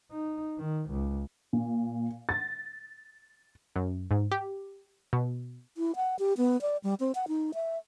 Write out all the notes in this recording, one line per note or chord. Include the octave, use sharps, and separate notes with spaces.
D#4
D#3
C#2
A#2
A6
F#2
G#2
G4
B2
E4
F#5
G4
B3
D5
G3
C4
F#5
D#4
E5